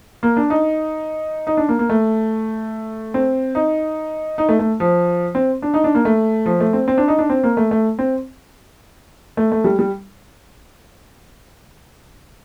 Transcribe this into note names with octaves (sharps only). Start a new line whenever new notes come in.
A#3
D4
D#4
D#4
D4
A#3
A#3
A3
C4
D#4
D#4
A3
A3
F3
C4
D4
D#4
D4
A#3
A3
F3
A3
C4
C4
D4
D#4
D4
C4
A#3
A3
A3
C4
A3
A3
G3
G3